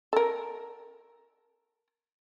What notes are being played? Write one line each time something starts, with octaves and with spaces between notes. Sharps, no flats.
A4 A#4